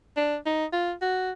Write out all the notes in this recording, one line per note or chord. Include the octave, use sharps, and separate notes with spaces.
D4
D#4
F4
F#4